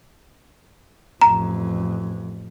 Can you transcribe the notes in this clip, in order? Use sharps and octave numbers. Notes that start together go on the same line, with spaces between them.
A1 F2 A#5